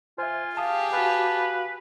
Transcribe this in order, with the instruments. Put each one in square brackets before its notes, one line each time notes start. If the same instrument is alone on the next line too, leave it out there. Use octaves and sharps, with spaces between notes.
[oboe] F4 [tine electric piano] C5 E5 [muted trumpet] G#5
[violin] G4 G#4 [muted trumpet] F5 [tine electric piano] A5 D#6
[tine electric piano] F#4 F5 [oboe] B4 [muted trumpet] A5